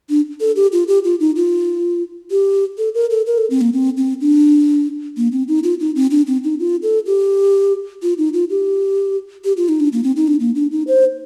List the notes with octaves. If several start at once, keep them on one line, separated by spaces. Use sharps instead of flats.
D4
A4
G4
F4
G4
F4
D#4
F4
G4
A4
A#4
A4
A#4
A4
C4
A#3
C4
C4
D4
A#3
C4
D#4
F4
D#4
C4
D4
C4
D#4
F4
A4
G4
F4
D#4
F4
G4
G4
F4
D#4
D4
A#3
C4
D#4
D4
A#3
D4
D#4
C5